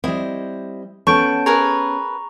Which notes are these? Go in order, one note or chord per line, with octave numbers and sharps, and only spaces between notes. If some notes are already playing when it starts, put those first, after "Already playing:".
G3 C4 E4 D#5
B3 C#4 A4 A5 C#6 G6 D7
G#4 A#4 B4 A#5 C#6